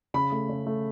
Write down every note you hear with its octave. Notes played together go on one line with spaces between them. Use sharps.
C#3 B5
A3
C#3
A3